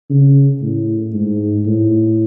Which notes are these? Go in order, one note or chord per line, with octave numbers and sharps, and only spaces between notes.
C#3
A2
G#2
A2